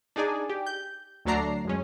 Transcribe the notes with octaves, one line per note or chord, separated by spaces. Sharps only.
D4 D#4 G#4 D5 G#5
G4
G6
D2 F#3 A3 D4 A#5 C7
F#2 G#3 C#4